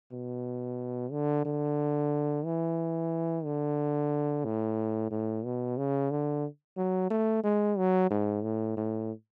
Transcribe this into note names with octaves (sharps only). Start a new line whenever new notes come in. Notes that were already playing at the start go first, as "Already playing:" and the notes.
B2
D3
D3
E3
D3
A2
A2
B2
C#3
D3
F#3
A3
G#3
F#3
G#2
A2
A2